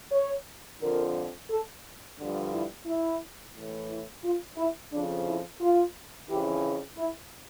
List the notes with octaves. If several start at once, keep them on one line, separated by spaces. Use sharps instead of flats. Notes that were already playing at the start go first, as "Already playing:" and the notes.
C#5
F2 D3 F3 A#4
A4
G2 D3 F3
E4
E4
A2 E3
E4
F4
E4
F2 C#3 F3 D4
E4
F4
F2 C#3 E3 G4
E4